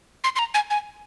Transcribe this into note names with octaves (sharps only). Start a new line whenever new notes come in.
C6
C6
A#5
G#5
G#5